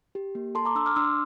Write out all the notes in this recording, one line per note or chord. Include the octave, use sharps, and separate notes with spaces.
G4
A#3
A4 A5 C6
A#5 D6
D4 C6 E6
D6 F6
D4 C6 E6